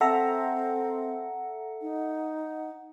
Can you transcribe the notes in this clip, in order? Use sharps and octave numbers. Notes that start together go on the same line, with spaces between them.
C4 A4 E5 F#5 A#5
D#4